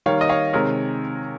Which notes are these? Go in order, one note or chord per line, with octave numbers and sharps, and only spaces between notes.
D#3 G3 A#3 C#5 F5
D#5
C#5 F5
C3 D#3 G#3 A#4 C#5